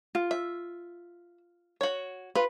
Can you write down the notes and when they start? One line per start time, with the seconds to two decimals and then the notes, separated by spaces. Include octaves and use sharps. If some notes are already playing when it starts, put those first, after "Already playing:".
0.15 F4
0.31 E5
1.81 F#4 C#5
2.35 F4 B4